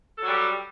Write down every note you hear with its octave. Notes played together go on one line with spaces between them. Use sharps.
F#3 G3 F#4 G4 A4